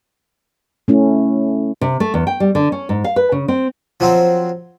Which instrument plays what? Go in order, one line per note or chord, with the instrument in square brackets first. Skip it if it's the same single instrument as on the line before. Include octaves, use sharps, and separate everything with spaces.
[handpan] A3 C#4 E4
[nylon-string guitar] C3
A3
E2
G5
G3
D3
C#4
G#2
F5
B4
C#3
C4
[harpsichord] F3 F#3 C4